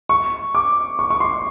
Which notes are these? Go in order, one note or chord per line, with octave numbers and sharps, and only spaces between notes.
C#6
D6
C#6
C#6
C6